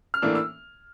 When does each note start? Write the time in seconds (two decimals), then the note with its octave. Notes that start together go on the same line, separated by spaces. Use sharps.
0.14 F6
0.22 A2 E3 A#3 D4 E6
0.35 E6